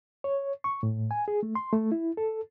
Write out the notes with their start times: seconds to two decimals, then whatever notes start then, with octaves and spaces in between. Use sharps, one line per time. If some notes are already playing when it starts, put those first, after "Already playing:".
0.24 C#5
0.64 C#6
0.83 A2
1.11 G#5
1.28 G#4
1.43 A3
1.55 C6
1.73 A3
1.92 E4
2.17 A4